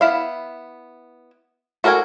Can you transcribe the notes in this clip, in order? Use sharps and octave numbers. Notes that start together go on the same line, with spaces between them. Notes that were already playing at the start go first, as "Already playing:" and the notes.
B3 E4 F5
F#4 A4 A#4 F5 G#5